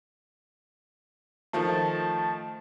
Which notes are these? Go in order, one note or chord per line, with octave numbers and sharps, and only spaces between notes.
D#3 F3 A3 A5